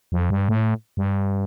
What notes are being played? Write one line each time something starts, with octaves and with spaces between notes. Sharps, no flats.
F2
G2
A2
G2